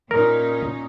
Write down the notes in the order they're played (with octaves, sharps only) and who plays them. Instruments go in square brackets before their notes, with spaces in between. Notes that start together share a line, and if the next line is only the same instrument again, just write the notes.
[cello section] A#2 C#4 D#4 [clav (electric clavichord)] A#4